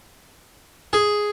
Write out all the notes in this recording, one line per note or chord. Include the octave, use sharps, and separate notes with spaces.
G#4